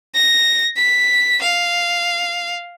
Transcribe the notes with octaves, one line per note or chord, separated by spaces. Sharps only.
A#6
B6
F5